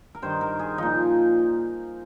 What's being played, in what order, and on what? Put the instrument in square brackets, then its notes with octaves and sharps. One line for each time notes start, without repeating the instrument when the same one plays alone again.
[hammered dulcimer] A#4
G2 D#3 C5
A#4
G#4
A#2 F3 D#4